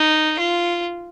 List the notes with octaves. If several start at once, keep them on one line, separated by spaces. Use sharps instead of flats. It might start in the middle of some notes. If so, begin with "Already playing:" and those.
Already playing: D#4
F4